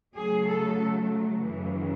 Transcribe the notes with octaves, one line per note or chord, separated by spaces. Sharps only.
C#3 F#3 A3 G#4
A4
F#2 C#3 E3